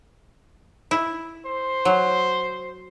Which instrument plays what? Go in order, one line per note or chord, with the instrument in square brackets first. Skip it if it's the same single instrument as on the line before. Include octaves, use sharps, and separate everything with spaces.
[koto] E4
[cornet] C5
[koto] F#3